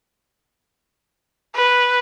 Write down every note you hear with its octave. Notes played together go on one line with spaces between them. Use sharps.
B4